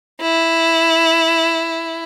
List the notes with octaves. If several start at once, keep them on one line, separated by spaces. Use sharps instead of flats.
E4